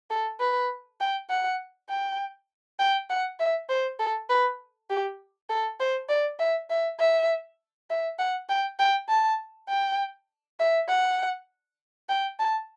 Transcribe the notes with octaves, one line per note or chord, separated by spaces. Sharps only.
A4
B4
G5
F#5
G5
G5
F#5
E5
C5
A4
B4
G4
A4
C5
D5
E5
E5
E5
E5
F#5
G5
G5
A5
G5
E5
F#5
G5
A5